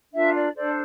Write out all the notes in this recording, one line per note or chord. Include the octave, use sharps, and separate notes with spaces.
D4 F4 A#4 E5
D5
D4 A4 C5 D5